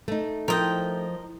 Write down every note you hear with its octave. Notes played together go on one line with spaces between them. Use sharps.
A3 D#4
F3 A#4 D#5 G5